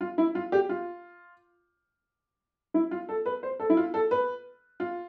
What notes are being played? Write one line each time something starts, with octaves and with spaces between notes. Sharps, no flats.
F4
E4
F4
G4
F4
E4
F4
A4
B4
C5
A4
E4
F4
A4
B4
F4